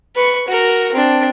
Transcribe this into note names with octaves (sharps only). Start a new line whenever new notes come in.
B4 C#6
F#4 A#4
C4 D4